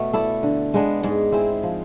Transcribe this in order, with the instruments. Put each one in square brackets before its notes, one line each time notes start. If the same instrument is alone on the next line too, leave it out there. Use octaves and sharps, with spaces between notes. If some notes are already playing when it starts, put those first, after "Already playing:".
Already playing: [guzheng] B2 [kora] A3 B3
[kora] E4 A4 D5
D3
G#3 B3 D4
[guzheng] G#2 [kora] G#3
[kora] C4 E4 G#4
F3